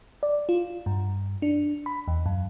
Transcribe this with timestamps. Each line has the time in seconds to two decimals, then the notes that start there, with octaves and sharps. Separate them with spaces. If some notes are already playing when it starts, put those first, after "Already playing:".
0.23 D5
0.49 F4
0.86 G2
1.42 D4
1.86 B5
2.08 E2
2.26 F#2